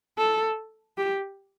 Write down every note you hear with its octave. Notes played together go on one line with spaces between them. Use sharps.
A4
G4